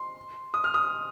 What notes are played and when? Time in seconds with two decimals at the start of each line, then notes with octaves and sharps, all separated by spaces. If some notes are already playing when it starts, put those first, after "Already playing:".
Already playing: C6
0.54 D#6
0.64 F6
0.74 D#6